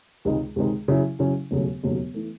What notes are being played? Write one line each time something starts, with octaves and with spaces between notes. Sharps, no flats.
C#2 C3 D#3 G#3 D#4
C#2 C3 D#3 G#3 D#4
C#3 F#3 C#4 E4
C#3 F#3 C#4 E4
E1 D#2 C#3 F#3 A3
E1 D#2 C#3 F#3 A3
E3 A3